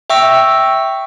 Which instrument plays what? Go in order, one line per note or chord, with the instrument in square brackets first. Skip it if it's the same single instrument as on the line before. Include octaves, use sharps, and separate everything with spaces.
[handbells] E5 G5 C#6 E6 A#6